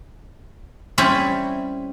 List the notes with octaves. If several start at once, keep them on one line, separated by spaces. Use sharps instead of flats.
G3 C4 C#4 E4